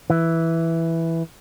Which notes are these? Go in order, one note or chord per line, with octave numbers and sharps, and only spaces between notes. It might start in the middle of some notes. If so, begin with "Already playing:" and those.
E3